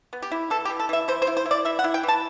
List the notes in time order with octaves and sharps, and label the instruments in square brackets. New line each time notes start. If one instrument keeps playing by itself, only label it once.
[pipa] B3
G4
E4
E3 A4
G4
E3
A4
E3 E5
E3 C5
C5
E4
C5
E4
D5
E3 E5
F#5
E4
G5
E3
A5